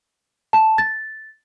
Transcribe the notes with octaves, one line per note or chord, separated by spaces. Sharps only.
A5
A6